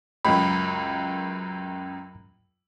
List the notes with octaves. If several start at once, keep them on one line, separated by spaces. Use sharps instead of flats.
C#2 F#2 B5